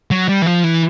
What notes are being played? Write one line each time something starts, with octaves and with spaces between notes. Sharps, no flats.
F#3
G3
E3
F3
E3